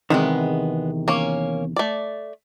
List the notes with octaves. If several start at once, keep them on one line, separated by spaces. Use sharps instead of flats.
E2 C3 D#3 G#3 B3
A#3 C#4
A3 D5